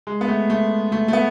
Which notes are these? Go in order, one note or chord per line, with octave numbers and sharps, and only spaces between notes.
G#3
B3
A3
A3
A3
A3
B3